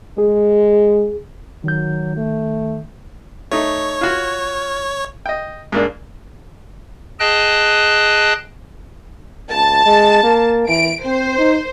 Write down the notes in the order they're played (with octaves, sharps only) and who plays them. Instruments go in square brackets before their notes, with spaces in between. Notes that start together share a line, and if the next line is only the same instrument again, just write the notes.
[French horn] G#3 [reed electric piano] G#4
[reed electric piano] D#3 G6 [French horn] F#3
[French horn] A3
[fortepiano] A3 D#4 [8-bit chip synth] C#5
[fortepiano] F4 F#4
D#5 G5
G#2 A#3 D4
[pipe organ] G#4 D#5 G5 A5 F#6
[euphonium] C#2 [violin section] A5
[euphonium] G#3
A#3
[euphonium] E3 [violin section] D7
[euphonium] C4 [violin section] C5
[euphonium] D#4